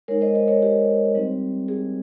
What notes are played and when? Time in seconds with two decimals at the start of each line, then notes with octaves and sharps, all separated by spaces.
0.08 G#3 D#4 A#4 C#5
0.21 C5 D#5
0.35 C5 D#5
0.48 A#4 C#5
0.62 G4
1.15 G3 C4 D#4
1.68 G#4